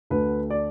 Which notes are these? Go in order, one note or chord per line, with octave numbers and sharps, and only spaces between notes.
D2 D3 A3 B4
D5